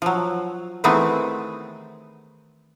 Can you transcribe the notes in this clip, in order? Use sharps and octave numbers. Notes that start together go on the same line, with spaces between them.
F3 F#3
D#3 E3 G#3 A3 B3 C4